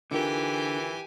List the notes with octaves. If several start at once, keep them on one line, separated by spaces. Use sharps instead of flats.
D3 E3 D#4 F4 G4 A#4 G#5